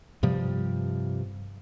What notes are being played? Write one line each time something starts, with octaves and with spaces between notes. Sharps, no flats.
G2 C3 F3 G3